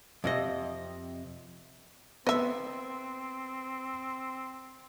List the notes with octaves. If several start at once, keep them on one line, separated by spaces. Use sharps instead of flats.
F2 C3 D#5
B3 C4 D#5 E5